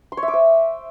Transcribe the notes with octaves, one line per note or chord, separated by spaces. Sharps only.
C6
C#5
E5
D6
C5